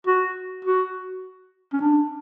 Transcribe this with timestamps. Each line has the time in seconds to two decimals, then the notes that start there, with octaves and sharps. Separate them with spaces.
0.07 F#4
0.65 F#4
1.73 C#4
1.81 D4